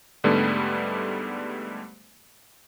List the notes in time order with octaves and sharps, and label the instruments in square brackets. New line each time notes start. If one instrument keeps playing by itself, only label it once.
[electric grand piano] G#2 D3 G3 A3 B3